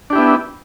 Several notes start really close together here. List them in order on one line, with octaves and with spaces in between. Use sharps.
D4 G4 E4 B3